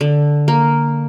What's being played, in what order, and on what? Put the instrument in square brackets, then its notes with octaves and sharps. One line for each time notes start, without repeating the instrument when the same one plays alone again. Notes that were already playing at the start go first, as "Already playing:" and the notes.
[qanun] D3
A#3